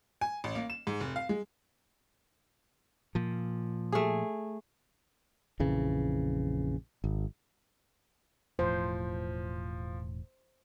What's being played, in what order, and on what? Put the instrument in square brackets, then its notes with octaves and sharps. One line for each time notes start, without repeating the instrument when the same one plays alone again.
[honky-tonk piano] G#5
A1
A#3
E7
G#2
F1
F5
G#3
[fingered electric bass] A#2 F3
[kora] A3 G#4
[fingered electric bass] A#1 F2 C#3 E3
G#1
[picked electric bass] E1 A2 [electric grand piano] F3 [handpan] C5